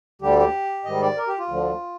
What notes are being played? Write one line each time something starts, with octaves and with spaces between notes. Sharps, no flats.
D2 D3 G3 G4
G4
G#2 D#3 G3 D#5
D5
A#4
G4
F4
D2 D3 F3